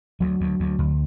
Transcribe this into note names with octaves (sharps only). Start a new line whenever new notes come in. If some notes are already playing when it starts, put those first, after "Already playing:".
D2 F#3
D2
D2
D2